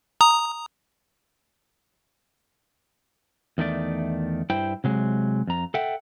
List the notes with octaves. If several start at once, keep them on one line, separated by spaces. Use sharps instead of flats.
A#5 D#6
E2 D#3 A3 D5
G2 E4 C5 G5
C3 F#3 G#3
F2 A#5
A4 E5 F#5 G5